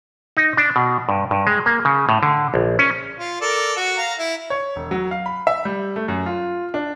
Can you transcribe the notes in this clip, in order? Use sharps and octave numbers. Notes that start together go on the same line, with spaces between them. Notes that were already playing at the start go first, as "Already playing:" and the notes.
D#4
D4
B2
G2
G2
G#3
A#3
C#3
A2
D3
A#1
C#4
F4
A4 A#4 D5
F#4
F5 A#5
E4
C#5
E1
F#3
F5
B5
E5
G3
A3
F#2
F4
D4